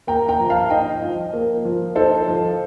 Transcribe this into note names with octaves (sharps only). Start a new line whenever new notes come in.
A#3 G5 A#5
G5 A#5
F3
F5 A5
D#4 D#5 G5
F3
A#3
F3
D#4 A4 C5
F3